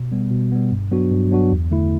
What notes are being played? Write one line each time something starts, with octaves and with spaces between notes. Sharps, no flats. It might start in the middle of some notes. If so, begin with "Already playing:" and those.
Already playing: B2
G3 B3
B2
G3 B3
G2
F#3 B3 D4 F#4
G2
F#3 B3 D4 F#4
E2
D3 A3 E4